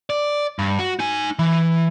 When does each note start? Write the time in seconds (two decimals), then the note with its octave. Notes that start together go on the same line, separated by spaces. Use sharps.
0.10 D5
0.59 G2
0.79 F#4
0.99 D#4 G#5
1.39 E3